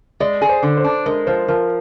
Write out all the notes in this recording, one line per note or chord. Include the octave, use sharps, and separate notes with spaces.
G#3 D5
G#4
C5
D3
C5
D4
G#3 A#4
F3 C5
F3 A#4